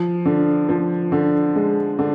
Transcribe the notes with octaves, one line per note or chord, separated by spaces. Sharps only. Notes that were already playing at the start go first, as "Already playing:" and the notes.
Already playing: F3
D3
F3
D3
G#3
D3